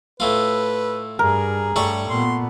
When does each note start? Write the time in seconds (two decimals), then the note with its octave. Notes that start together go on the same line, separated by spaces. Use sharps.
0.20 A2 A3 F4 B4
1.19 G2 G#4 A#4
1.76 G2 G3 A3 C#5 C#6
2.10 A#2 B3 C6